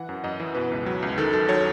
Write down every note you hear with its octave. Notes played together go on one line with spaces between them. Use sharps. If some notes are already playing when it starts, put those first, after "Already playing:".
Already playing: E3 F#5
F#2
F#2 D#5
E3
B2 B4
C#2
F#3
C#2
D#3 A4
F#2 A4
F#3 C#5